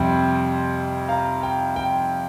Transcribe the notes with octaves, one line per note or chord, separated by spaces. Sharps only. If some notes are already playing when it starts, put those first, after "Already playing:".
Already playing: F2 C3 G3 C4 G5 C6
F5 A#5
G5
G5